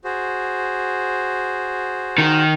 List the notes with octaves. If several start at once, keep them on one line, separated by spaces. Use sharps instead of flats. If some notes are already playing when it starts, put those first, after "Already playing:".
F#4 G#4 C5
D#3